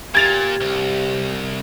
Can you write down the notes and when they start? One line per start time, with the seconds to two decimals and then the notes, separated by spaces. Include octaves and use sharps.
0.15 A#2 G4 G#6 A6 F7
0.60 C2